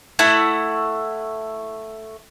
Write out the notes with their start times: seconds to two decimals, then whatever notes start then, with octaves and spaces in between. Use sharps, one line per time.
0.19 A3 E4 F#5